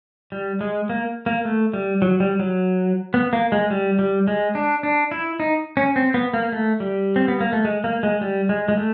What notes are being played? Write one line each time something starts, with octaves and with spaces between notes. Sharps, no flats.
G3
G#3
A#3
A#3
A3
G3
F#3
G3
F#3
B3
A#3
G#3
G3
G3
G#3
D4
D4
E4
D#4
C#4
C4
B3
A#3
A3
G3
C4
B3
A#3
A3
G#3
A#3
G#3
G3
G#3
G#3
A3